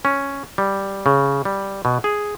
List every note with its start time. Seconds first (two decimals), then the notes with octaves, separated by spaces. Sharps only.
0.05 C#4
0.58 G3
1.06 C#3
1.45 G3
1.85 B2
2.04 G#4